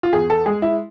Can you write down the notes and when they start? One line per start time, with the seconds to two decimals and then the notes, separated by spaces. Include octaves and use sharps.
0.03 F4
0.13 E2 G#4
0.30 A4
0.46 G#3 G#4
0.62 E4